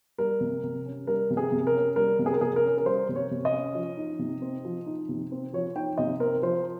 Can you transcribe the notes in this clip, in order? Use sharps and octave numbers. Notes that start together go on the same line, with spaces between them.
G3 A#4
C3
C3
C#4
G3 A#4
C3
G#4
C3
A#4
C#4
G3 A#4
C3
G#4
A#4
C3 G#4
A#4
C#4
A#4
G3 C5
C3
C#5
C3
D#5
C#4
F3
D#4
C3
C4
F3
D#4
C3
C4
F3 C#5
D#4 G5
C3 D#5
C4 A#4
F3 C5